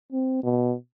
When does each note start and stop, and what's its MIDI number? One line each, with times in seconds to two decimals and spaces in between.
0.12 0.39 60
0.43 0.74 47